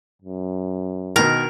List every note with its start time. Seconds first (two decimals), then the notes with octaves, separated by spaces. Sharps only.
0.22 F#2
1.16 B2 D#3 A#4